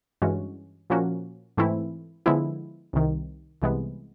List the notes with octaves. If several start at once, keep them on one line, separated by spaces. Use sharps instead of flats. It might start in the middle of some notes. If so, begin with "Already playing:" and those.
G2 E3 G#3 C#4 F#4
A#2 F3 A#3 C#4 F#4
G#2 E3 A3 C4 E4
D3 F3 G#3 B3 E4
C2 C3 D#3
C2 C3 E3 G#3 B3